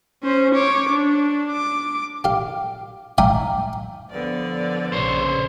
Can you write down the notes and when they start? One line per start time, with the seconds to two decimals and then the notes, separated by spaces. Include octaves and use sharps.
0.24 C#4 C5
0.55 C#5 D6
0.90 D4
1.52 D6
2.24 G4 F5
3.18 E5 F5 G5 G#5 A#5 D6
4.10 D3 F3 B3 D5
4.92 A#1 C#3 C5 C#5